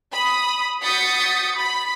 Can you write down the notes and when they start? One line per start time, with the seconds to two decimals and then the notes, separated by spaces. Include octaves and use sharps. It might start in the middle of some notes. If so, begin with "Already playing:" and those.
0.12 B5 D#6
0.82 F#4 D#6 G6 A6 B6 C#7
1.56 B5 B6